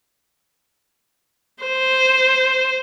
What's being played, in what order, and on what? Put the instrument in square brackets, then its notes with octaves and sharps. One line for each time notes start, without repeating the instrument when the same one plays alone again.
[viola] C5